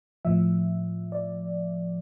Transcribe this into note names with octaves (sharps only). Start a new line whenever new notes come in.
A2 F3 E5
D5